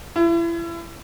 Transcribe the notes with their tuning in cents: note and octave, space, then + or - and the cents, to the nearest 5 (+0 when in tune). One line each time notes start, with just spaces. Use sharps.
E4 +35